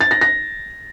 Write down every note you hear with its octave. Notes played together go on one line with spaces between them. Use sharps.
A6
A#6
A#6